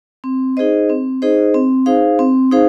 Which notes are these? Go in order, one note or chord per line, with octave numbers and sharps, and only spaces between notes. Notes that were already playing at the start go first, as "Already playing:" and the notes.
C4
D#4 G#4 C5 D#5
C4
D#4 G#4 C5 D#5
C4
D#4 G#4 C5 F5
C4
D#4 G#4 C5 F5